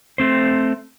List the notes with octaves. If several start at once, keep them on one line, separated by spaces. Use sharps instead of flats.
A3 C4 C5